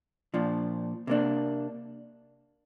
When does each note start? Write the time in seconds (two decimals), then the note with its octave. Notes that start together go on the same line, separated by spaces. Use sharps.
0.34 A#2 F3 D4
1.07 C3 A#3 D4